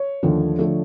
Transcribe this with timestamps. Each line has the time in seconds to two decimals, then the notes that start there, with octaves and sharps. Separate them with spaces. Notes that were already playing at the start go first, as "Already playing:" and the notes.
Already playing: C#5
0.23 D#2 D3 F3 A3
0.59 D3 F3 A3